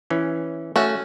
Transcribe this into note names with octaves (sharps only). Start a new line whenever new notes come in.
E3 C#4
A3 C#4 F#4 E5